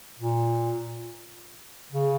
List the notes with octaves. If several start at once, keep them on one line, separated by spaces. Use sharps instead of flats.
A#2
C#3